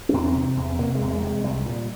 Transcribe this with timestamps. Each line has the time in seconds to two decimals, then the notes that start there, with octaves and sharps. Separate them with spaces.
0.09 C#4
0.14 E2 C4
0.35 C3
0.57 E2
0.79 C3 A#3
0.95 G#3
1.01 E2
1.11 G#3
1.22 C3 G#3
1.43 C2 G3
1.66 A#2